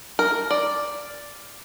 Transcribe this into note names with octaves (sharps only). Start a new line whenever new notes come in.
A#4
D5